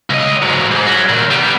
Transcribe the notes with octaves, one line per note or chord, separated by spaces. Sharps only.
C#2 D#5
G#2 F#3
G#2
C#4 F#4
A#2 D#3
G3 B3